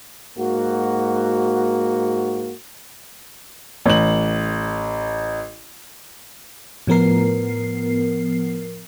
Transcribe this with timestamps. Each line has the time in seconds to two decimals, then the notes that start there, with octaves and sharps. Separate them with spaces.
0.38 G#2 A#3 F#4
3.86 A1 F#7
6.87 A2 F3 B3 A#4 C7